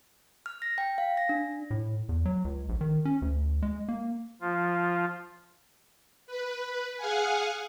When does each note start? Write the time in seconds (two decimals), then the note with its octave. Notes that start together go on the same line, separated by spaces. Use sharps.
0.46 F6
0.62 A#6
0.78 G5
0.98 F5
1.17 A#6
1.29 D4
1.71 A2
2.09 E2
2.25 F#3
2.45 C#2
2.69 A#1
2.81 D#3
3.05 C#4
3.22 D2
3.62 G#3
3.88 A#3
4.41 F3 F4
6.27 B4
6.97 G#4 F5 F#5 G#5